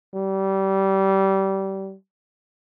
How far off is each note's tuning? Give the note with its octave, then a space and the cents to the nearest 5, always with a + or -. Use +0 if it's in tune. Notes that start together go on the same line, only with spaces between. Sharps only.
G3 -25